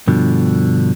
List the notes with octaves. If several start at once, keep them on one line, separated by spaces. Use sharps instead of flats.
G2 B2 D3 F3